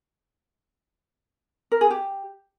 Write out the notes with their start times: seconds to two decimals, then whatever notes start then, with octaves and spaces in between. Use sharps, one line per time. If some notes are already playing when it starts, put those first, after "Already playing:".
1.72 A#4
1.81 G#4
1.90 G4